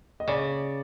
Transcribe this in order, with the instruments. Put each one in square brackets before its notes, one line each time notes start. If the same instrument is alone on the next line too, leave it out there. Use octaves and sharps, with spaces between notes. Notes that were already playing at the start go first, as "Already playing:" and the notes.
[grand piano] D#5
[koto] C#3 [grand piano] D5